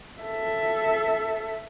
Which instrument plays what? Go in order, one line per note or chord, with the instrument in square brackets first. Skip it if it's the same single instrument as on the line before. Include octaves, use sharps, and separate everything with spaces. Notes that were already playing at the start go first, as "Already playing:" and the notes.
[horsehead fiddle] A4 E5